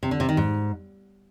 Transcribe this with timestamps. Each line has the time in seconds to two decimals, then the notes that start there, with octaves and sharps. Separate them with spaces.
0.03 C3
0.11 D3
0.20 C3
0.29 D#3
0.37 G#2